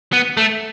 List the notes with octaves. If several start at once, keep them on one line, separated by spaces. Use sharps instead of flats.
B3
A3